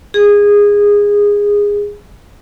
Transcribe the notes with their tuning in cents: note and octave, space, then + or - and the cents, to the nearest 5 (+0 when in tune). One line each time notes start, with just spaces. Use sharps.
G#4 -15